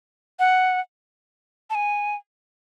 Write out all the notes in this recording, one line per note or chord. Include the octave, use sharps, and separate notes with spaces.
F#5
A5
G#5